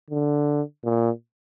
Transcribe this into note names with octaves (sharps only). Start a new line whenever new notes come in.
D3
A#2